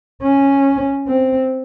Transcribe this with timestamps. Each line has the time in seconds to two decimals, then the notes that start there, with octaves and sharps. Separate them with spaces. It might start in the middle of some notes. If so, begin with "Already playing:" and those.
0.23 C#4
1.07 C4